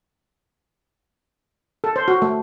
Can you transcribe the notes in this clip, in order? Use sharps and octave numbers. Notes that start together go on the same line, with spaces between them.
A4
C5
F#4
A3